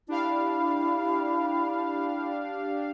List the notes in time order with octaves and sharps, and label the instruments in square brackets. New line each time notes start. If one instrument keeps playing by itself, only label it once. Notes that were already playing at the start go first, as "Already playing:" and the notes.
[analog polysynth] D4 G4 F5 [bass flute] E4